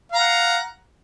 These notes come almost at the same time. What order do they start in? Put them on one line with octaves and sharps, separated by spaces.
F5 A#5 F#5